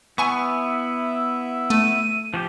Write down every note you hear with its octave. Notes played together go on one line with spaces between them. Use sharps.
B3 E4 E5 G#5 C#6
A3 D#7
F3 F#4 G4